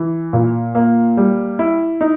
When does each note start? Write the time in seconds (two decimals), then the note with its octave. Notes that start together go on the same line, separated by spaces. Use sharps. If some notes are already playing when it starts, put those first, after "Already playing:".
Already playing: E3
0.33 A#2
0.75 A#3
1.17 G3
1.59 E4
2.01 D#4